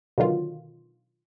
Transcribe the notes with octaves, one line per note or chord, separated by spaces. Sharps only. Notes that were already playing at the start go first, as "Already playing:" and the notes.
B2 D3 D#3 F#3 F4